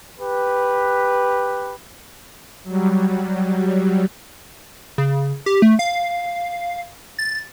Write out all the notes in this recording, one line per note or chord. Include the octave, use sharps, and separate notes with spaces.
G4 B4
F#3 G3
C#3
G4
A3
F5
A6